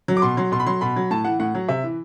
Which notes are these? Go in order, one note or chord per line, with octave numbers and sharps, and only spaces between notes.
F#3
D6
B2 C6
F#3 C6
B2 C6
B5
F#3 C6
B2 B5
F#3
A2 A5
E3 F#5
A2 F#5
F#3
C3 E5
E3